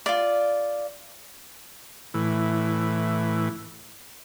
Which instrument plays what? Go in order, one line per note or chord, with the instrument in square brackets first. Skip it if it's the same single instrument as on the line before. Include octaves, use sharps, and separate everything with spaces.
[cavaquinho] F4 D5
[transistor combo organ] A2 E3